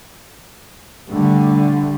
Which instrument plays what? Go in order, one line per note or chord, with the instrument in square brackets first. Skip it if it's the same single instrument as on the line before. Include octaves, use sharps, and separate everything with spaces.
[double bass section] D3 G3 A3